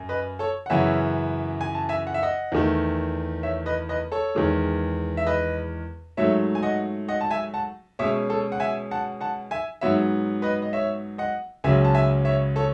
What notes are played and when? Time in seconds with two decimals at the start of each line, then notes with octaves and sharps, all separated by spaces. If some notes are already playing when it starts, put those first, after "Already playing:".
Already playing: F#2
0.09 B4 D#5
0.39 A4 C#5
0.66 F#5
0.70 F#2 C#3 E3 B3 C#5 E5
1.61 G#5
1.75 A5
1.89 E5 G#5
2.07 F#5
2.14 E5
2.22 D#5 F#5
2.52 E2 D#3 A3
3.43 C#5 E5
3.66 B4 D#5
3.89 B4 D#5
4.12 A4 C#5
4.35 E2 D#3 G#3
5.17 E5
5.27 B4 D#5
6.17 G#2 F#3 A3 C#5 E5
6.55 G#5
6.63 D#5 F#5
7.08 D#5 F#5
7.21 A5
7.31 E5 G#5
7.54 F#5 A5
7.99 B2 G#3 C#4 C#5 E5
8.29 A4 C#5
8.52 F#5
8.60 E5 G#5
8.91 F#5 A5
9.21 F#5 A5
9.51 E5 G#5
9.81 G#2 F#3 B3 C#5 E5
10.42 B4 D#5
10.62 D#5
10.73 C#5 E5
11.18 D#5 F#5
11.64 C#2 C#3 F#3 C#4 E5 G#5
11.85 A5
11.94 E5 G#5
12.25 C#5 E5
12.56 A4 C#5